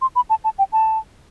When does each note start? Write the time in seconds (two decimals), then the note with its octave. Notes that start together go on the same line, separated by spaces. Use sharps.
0.02 C6
0.16 B5
0.30 A5
0.44 A5
0.58 G5
0.73 A5